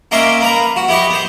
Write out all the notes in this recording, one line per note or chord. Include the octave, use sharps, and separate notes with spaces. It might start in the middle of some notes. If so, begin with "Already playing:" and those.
A#3 C#4 D#5 E5 C6 D6
A#3 B4 A#5
F#4
E4 G4 B4 D#5 C#6
B3 C5